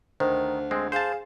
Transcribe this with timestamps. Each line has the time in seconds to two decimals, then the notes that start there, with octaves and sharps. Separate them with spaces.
0.20 D2 D#3 C5
0.71 G#3 C4
0.92 G#4 C5 F5 A5